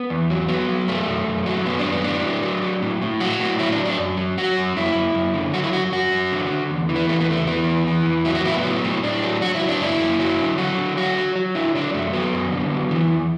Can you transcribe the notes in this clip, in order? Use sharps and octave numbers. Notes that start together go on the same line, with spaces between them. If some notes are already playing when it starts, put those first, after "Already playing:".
Already playing: B3
E2
F#3
F#3 B3
F#3
F#2 A3
F#2
F#2
F#3
F#2 B3
D4
F#2
B3
A2 D4
F#3
F#3
F#3
A2
A2
F#3 F#4
A2
F#3 E4
D4
F#3
D4
F#2
F#3
F#3 F#4
F#2
F#2 E4
F#2
F#2
D3
F#3 F#4
E4
F#2 F#4
F#2 F#4
F#2
D3
D3
E2
E3
B3
E2 A3
B3
E2 A3
E3 B3
E2
E3
E2
F#3 E4
F#4
A2 E4
B3
F#3
A2
A2 D4
F#3
F#3 F#4
E4
F#3
D4
F#2 E4
F#2
F#3
D3
F#3 F#4
D3
F#3 F#4
F#3
F#3
D3 E4
F#3 D4
F#2 A3
F#3 B3
F#2
D3
F#3
E3
E2